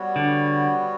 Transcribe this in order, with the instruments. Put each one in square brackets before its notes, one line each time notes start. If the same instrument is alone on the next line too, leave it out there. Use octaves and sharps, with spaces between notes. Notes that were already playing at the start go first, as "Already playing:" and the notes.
Already playing: [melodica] G3 B3 F#4 C#5
[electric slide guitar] D3